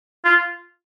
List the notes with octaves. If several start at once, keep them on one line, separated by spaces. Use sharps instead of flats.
F4